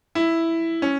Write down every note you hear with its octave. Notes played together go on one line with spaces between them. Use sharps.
E4
C#4